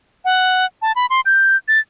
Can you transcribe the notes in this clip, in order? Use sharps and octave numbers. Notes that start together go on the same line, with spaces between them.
F#5
A5
B5
C6
G6
A6